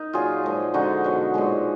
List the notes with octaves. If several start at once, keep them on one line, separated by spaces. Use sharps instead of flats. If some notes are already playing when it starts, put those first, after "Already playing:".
Already playing: D#4 A#4
A#2 F#3 F4 G#4
A#2 F3 G#3
D3 F3 G#3 D#4 F#4
B2 F#3
A#2 F3 G#3